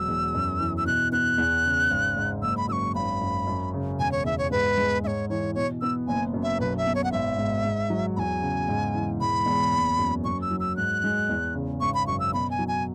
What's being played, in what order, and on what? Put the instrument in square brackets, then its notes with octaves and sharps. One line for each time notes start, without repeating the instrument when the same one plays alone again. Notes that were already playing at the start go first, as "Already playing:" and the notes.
Already playing: [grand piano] E1 B2 F#3 [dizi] E6
[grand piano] E2
F#2
E3
[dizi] E6
[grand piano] B2 [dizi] F#6
[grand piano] B3 [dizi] F#6
[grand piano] E2
C#3
G#1
G#2
[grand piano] F#1 [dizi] E6
[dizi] B5
[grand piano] F#2 [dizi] E6
[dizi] C#6
[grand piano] G#1 [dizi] B5
[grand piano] F#2
F#2
C#3
[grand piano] E1 [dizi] G#5
[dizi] C#5
[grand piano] E2 [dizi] E5
[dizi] C#5
[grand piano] G#2 [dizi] B4
[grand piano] G#3
[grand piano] G#2 [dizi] C#5 E5
[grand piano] E3 [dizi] C#5
[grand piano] B2 [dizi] C#5
[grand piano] B3 [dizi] E6
[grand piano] F#1 [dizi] G#5
[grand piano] F#2
[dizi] E5
[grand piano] B1 [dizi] B4
[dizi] E5
[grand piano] B2
[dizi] C#5
F#5
[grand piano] G#1 [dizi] E5
[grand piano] G#2
G#2
F#3
[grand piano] E2 [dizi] G#5 B5
[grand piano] C#3
G#2
E3
[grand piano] E1 [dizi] B5
[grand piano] E2
F#1
F#2
[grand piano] F#2 [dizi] C#6
[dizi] E6
[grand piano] F#3
[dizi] E6
[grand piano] G#2 [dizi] F#6
[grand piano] G#3
E2
C#3
[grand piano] G#1 [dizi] C#6
[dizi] B5
[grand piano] F#2 [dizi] C#6
[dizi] E6
[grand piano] B2 [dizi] B5
[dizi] G#5
[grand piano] F#3
[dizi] G#5